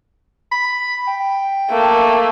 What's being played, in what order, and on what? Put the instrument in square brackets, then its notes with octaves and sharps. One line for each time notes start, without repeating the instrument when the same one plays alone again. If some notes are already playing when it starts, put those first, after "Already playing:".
[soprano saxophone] B5
G5
[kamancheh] A3 A#3